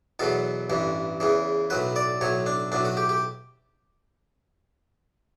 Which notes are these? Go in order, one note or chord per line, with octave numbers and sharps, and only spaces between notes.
E2 B2 F#3 A4
A1 G2 E3
E2 C#3 E3
B1 A2 F#3 B4
D5
B1 A2 F#3 C#5
D4
B1 A2 F#3 D4
F#4
G4
G4